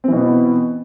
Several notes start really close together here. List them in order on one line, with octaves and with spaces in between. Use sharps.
C4 E3 B2 B3